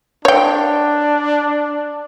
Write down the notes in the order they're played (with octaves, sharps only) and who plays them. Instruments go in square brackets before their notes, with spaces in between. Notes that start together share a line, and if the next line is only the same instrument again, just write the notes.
[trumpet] D4 [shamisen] C#5 G5